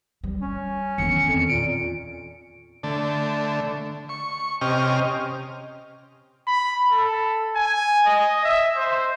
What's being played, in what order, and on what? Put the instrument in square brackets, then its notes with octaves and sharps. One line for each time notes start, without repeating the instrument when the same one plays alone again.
[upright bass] G3
[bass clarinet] C#4
[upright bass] E2 D#3 [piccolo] C#7
[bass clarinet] F2
[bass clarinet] A#2 [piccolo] D7
[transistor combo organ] D3 A3
C#6
C3 C#4 G4 D#5 F6
[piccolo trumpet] B5
A4
G#5
D#5
E5
C5